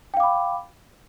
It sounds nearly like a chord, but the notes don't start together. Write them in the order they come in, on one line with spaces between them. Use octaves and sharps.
G5 F5 D6 B5